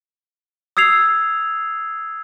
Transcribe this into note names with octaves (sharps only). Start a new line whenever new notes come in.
D#6 E6 G#6 C7 F7